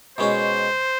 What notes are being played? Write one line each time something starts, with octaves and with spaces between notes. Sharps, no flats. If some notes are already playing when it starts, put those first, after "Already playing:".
B2 G#3 C#4 F#4 C5